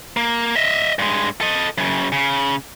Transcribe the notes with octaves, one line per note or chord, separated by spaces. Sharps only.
A#3
D#5 E5
G2 G#3
A4 D#5
F#2 C#3
C#3